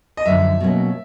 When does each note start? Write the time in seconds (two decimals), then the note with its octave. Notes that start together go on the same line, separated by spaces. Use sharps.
0.17 D#5
0.25 F#2 D3 F3 E5
0.60 B2 F#3 A#3 C#4